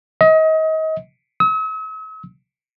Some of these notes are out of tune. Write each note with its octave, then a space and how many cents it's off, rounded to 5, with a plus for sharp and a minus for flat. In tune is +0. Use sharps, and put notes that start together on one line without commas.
D#5 +30
E6 -45